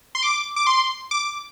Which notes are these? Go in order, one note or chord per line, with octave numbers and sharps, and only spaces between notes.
C6
D6
D6
C6
D6